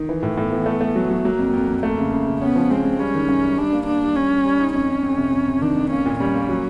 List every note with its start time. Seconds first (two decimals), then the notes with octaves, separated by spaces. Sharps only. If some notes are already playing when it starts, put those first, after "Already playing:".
Already playing: D#3
0.09 E3
0.23 A2
0.37 A2 B3
0.52 E3
0.66 A3
0.81 A3
0.95 F#3
1.10 F#3
1.25 F#3 A#3
1.39 F2
1.53 F2
1.68 F2
1.83 A3 A#3
1.98 C#3
2.12 C#3
2.27 C#3
2.41 B3 C#4
2.56 F3
2.70 G#3 C4
2.84 G#3
2.99 G3 C#4
3.14 D#3
3.29 F#2
3.43 G3
3.58 G3 D4
3.73 A#3
3.87 A#3 D4
4.02 G3
4.16 G3 C#4
4.31 G3
4.45 G3
4.60 D#4
4.74 F2 C#4
4.88 F2
5.03 F2
5.17 C3
5.33 F2
5.48 C3
5.62 D#3 D4
5.76 F2
5.91 A#3 C#4
6.06 A#2
6.20 G3 C#4
6.34 A#3
6.49 F#3